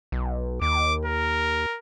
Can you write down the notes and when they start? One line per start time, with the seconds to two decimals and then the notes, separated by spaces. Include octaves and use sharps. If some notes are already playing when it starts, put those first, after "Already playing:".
0.12 B1
0.62 D#2 D6
1.05 A#4